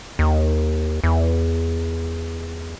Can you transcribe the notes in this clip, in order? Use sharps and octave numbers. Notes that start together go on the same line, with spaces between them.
D#2
E2